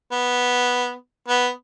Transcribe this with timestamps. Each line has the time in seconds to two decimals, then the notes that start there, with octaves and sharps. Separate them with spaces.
0.12 B3
1.28 B3